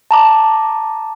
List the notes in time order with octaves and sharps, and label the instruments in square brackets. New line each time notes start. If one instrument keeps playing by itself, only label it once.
[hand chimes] A5 A#5 D6